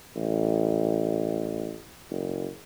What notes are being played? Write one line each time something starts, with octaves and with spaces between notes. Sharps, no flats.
A1
F#1